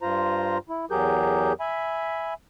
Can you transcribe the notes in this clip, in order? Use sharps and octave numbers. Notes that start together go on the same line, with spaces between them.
G2 F4 C5 A#5
E4
E2 F#3 G4 G#4 A#4 G6
E5 G#5 B5